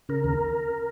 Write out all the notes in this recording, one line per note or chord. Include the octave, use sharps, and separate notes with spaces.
C#3 A#4
D#2